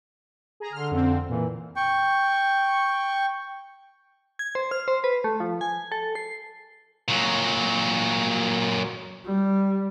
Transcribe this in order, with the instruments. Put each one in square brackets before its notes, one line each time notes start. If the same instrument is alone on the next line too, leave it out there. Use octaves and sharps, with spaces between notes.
[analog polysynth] G#4 A#5
[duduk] D3 [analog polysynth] C6 F6
[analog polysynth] F2 C4
[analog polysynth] A#2 [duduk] E3
[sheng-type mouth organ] G5 C#6
[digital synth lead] G#6
C5
F6
C5
B4
A3
F3
G#5
A4
C7
[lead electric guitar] A#2 F#3
[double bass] G3